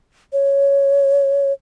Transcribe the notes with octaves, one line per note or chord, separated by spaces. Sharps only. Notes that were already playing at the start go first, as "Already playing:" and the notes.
C#5